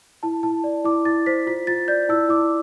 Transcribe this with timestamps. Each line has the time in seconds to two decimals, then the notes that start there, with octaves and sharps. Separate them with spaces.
0.23 E4 A5
0.43 E4 A5
0.64 D5
0.84 E4 D6
1.05 E4 A6
1.26 C5 B6
1.47 F4 B6
1.67 F4 A6
1.88 D5 G6
2.09 E4 E6
2.29 E4 D6